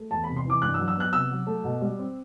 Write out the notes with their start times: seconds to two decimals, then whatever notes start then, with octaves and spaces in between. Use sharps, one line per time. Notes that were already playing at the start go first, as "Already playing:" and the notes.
Already playing: A3
0.11 E2 A5
0.24 B5
0.28 C3
0.37 C6
0.45 E3 D6
0.62 G2 F#6
0.74 E6
0.79 F#3
0.88 E6
0.97 B3 F#6
1.13 C3 E6
1.31 F#3
1.47 A3
1.64 B2
1.82 G3
1.99 C4